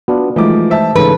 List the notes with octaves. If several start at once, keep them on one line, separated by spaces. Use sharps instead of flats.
B3 D4 F4 F#4
E3 F3 G#3 A3 D#4 D6
C5 E5 A5
G#2 C#3 E3 A4 B4